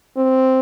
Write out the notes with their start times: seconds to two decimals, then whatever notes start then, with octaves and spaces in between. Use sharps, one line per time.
0.17 C4